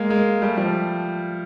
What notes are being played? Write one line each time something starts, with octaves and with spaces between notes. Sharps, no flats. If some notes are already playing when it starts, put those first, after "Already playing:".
Already playing: G#3 A#3
G#3 A#3
G3 A3
F3 G3